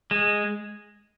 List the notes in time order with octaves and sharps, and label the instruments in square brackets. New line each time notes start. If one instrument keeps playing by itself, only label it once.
[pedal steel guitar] G#3